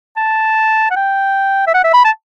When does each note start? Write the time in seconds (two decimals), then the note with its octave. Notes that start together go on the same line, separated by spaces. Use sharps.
0.17 A5
0.91 F#5
0.96 G5
1.67 E5
1.74 F#5
1.84 E5
1.93 B5
2.05 A5